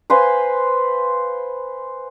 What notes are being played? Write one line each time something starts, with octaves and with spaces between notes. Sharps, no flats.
B4 C5 F5 G#5